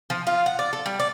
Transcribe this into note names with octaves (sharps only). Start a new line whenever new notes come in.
F3
F4
F#5
D5
A4
G3
D5